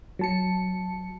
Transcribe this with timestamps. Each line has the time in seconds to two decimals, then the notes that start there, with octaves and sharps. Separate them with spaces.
0.19 F#3 A5 C#7